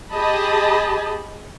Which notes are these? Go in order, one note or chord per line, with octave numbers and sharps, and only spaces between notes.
G4 G#4 D#5 A5 B5